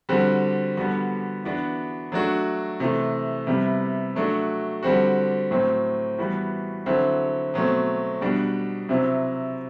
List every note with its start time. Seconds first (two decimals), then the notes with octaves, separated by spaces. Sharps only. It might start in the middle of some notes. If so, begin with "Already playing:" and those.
0.09 D3 G3 C4 F#4
0.77 D3 G3 B3 F#4
1.44 E3 B3 D4 F#4
2.12 F#3 A3 D4 F#4
2.80 C3 E3 A3
3.47 C3 G3 B3 E4
4.16 F#3 A3 D4 F#4
4.83 D3 G3 C4 F#4
5.51 A2 F#3 C4
6.19 E3 G3 B3 F#4
6.86 D3 F#3 C4 E4
7.54 B2 F#3 A3 C4
8.21 B2 G3 D4 F#4
8.89 C3 F#3 C4 E4